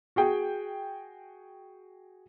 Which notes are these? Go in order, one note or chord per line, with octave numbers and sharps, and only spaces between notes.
F#4 G#4 G5